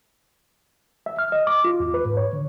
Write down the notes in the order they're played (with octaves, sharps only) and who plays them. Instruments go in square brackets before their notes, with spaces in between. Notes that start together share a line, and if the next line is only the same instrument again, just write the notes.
[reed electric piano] E5
F6
D#5
D6
F4
E2
B4
G#2
C#5
D3